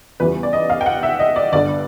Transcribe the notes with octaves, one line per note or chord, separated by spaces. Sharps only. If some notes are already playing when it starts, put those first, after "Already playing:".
E2 C#3 E3 G3 B4
D5
D#5
F5
G5
F#5
E5
D#5
D5
G1 G2 D3 D5